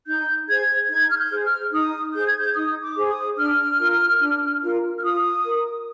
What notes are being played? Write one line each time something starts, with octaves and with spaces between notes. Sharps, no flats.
D#4 G6
G#4 C5 G#6
D#4 G#6
F6
G6
G#4 C5
F6
D#4 D#6
G#4 C5 G6
G#6
G6
D#4 D#6
D6
G#4 C5
D#6
D4 F6
F4 A#4
D4
F4 A#4
F6
F4 D#6
A#4